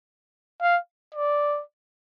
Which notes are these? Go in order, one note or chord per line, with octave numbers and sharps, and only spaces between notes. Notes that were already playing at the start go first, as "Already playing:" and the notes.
F5
D5